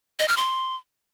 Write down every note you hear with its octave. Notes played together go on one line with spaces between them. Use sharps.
D#5
F6
C6